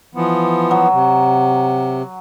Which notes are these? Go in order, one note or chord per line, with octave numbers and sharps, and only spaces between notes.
E3 F3 B3
F#3
C3